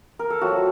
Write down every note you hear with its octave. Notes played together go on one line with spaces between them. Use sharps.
A#4
A4
F#3 A3 C4 F4 F#4